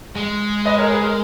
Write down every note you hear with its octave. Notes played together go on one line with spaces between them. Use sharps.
G#3
B4 D#5
A#4 C#5
G#4 B4
A#4